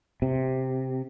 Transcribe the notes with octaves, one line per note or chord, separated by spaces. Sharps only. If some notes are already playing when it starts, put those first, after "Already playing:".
C3